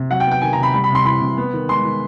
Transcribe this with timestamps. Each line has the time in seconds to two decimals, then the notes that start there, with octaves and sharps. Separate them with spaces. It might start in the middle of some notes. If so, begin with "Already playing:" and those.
Already playing: C3
0.10 F#3 F#5
0.20 G5
0.26 B3
0.31 G5
0.41 D#3 G#5
0.53 A#5
0.58 C3
0.63 B5
0.73 G3 B5
0.84 B5
0.90 C3 C6
1.05 E3 B5
1.21 C3
1.37 B3
1.53 D#3
1.69 G#3 C6
1.85 D#3